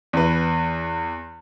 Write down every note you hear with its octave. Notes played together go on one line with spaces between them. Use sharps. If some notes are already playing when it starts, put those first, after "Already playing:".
E2 B4